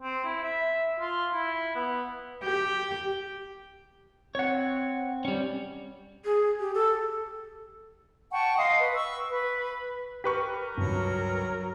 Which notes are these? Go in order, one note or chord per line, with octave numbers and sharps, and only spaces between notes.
C4
E4
E5
F4
E4
B3
G4
C4 C#5 F#5
G3 C#4
G#4
G4
A4
F#5 G5 A5 C#6
D#5 F5 C6 D#6
B4
C#6 E6
B4
G4 A#4 B4 C#6 B6 F#7
C#2 G2 F#3